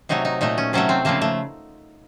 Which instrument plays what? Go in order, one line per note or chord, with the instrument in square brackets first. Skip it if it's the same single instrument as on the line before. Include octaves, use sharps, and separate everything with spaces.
[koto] C3 F#3 A3 D#4
D#4
A#2 A3 D#4
C#4
C3 F#3 A3 C#4
C4
C#3 F3 A3 A#3
A3